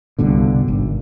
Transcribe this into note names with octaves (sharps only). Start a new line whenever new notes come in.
C2 G2 B2 D3
G#1